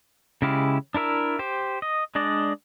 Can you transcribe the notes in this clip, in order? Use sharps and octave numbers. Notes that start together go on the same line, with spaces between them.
C#3 G#3 E4 G4 F5
D4 E4 A#4 E5
G4 C5
D#5
G#3 D4 D5 D#5